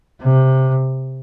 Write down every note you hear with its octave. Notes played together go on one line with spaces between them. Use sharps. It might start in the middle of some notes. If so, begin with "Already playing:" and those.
C3